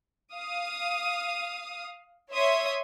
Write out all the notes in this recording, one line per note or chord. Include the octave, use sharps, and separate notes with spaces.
F5 D#6
C#5 E5 C6 D#6